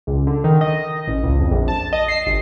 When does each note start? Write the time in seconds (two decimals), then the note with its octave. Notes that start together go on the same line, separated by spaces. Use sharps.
0.07 C#2
0.27 D3
0.44 D#3
0.61 D#5
1.07 A1
1.24 C#2
1.39 F2
1.51 A#1
1.68 A5
1.93 D#5
2.08 C7
2.27 G1